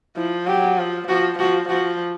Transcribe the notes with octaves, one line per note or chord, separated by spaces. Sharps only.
F3 E4
F#3 G4
F3
F3 F#4
F3 F#4
F3 F#4